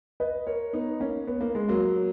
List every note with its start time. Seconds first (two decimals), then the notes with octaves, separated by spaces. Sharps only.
0.20 B4 D#5
0.47 A#4 C#5
0.73 B3 D#4
1.00 A#3 C#4
1.27 B3
1.41 A#3
1.55 G#3
1.69 F#3 A#3